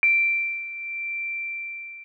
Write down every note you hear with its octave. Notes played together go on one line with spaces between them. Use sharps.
D7